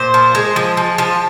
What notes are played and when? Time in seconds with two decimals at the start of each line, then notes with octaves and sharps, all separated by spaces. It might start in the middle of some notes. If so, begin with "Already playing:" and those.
Already playing: A#2 C5
0.14 F3
0.35 G#3
0.56 F3
0.77 F3
0.98 F3